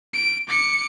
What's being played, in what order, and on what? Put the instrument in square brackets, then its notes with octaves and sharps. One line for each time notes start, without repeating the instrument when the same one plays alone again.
[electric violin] D7
D6 C#7